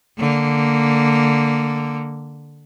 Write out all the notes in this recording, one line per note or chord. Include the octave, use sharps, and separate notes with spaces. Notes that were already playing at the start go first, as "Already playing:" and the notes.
D3 A#3